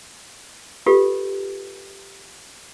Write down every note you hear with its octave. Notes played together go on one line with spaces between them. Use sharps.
F4 G4 A4 B4